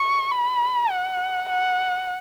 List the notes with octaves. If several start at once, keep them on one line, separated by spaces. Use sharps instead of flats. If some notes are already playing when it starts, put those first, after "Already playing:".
Already playing: C#6
B5
F#5
F#5